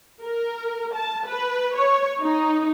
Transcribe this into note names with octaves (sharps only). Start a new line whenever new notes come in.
A#4
A5
B4
C#5
D#4